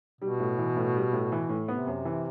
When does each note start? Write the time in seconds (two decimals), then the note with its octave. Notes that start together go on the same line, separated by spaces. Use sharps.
0.21 B2 G3
0.40 A2
0.58 E3
0.76 A2
0.95 G3
1.13 A2
1.32 E3
1.49 A2
1.68 C3 B3
1.87 F#2
2.05 E3